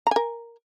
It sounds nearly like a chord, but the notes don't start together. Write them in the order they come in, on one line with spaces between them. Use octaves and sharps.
A#5 G#5 A#4